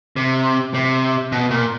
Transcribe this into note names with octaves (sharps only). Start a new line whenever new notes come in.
C3
C3
B2
A#2